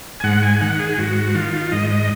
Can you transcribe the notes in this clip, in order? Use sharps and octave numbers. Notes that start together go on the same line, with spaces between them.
G#5
G#2 F#5
G#5
D#3 F#5
G#4
G#2 F#4
D#3 F4
G#2 D#5
D#5